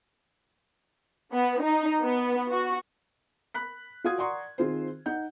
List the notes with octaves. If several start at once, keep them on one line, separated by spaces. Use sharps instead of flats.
B3
D#4
B3
F#4
B5 F#6 B6
F4 F#4 F5 D#6 G#6
D5 F#5 A#5 C6 C#6 D#6
D#3 C4 F4 G#4 C5
D#4 F#5 G6